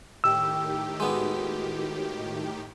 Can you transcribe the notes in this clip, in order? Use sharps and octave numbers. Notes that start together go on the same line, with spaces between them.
A2 D#3 G4 G5 E6
G#3 B3 F#4 D6